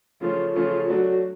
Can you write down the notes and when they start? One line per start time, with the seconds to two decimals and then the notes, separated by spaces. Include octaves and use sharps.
0.21 C#3 F3 A3 C#4 F4
0.55 C#3 F3 A3 C#4 F4
0.89 F#3 A3 D4 F#4